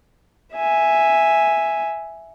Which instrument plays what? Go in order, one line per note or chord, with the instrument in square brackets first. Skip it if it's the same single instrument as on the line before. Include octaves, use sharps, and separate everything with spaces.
[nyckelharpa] E5 G#5